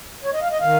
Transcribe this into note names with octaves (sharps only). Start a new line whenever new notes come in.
C#5
D#5
F5
D#5
D#3 F5